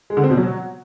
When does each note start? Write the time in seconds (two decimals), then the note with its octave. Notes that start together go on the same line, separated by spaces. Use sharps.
0.10 G#3
0.17 D3
0.24 C4
0.30 B2
0.37 F#3